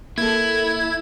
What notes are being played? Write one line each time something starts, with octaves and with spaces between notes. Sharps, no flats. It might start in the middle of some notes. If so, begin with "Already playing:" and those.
A#3 E4 A4 G#6